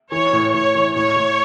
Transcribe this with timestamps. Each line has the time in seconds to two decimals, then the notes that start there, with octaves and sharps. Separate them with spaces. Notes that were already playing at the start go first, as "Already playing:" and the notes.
0.12 E3 C#5
0.33 A2
0.54 A2 C#5
0.75 E3
0.95 A2 C#5
1.16 A2